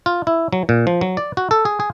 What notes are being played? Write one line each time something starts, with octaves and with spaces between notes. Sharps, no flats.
F4
E4
F#3
A#2
F3
F#3
D5
F#4
A4
G#4
G#4